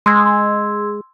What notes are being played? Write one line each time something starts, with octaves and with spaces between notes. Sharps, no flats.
G#3 C6 E6 G#6